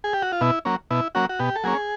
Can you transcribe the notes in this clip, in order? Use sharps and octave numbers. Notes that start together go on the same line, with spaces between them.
G#4
G4
F#4
F4
B2 E4
F#3 A#3 C#4
B2 E4
F#3 A#3 C#4 F#4
F#4
B2 G4
A4
F#3 A#3 C#4 G#4